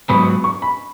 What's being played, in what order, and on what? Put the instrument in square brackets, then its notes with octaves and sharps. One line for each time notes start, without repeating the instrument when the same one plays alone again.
[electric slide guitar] G#2 F#3 B3 [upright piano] B5
[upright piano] C#6
B5